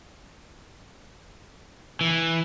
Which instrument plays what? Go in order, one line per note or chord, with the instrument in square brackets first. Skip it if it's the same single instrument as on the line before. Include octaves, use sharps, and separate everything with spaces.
[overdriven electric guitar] E3